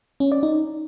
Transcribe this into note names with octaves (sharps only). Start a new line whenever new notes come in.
C#4
D5
D#4